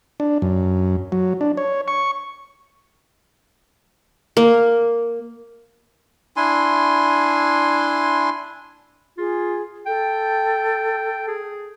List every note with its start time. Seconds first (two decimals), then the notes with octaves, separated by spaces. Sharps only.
0.20 D4
0.42 F#2
1.12 F#3
1.41 D4
1.57 C#5
1.88 C#6
4.37 A#3
6.36 D4 E4 G#5 C6
9.18 F4 G#4
9.86 A4 G5
11.28 G#4